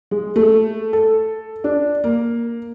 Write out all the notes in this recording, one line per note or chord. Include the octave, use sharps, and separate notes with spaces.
G#3
A3
A4
D4
A#3